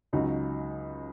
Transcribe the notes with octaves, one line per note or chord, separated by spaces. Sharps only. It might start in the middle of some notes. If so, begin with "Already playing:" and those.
C#2 C#3 F#3 D#4 F#4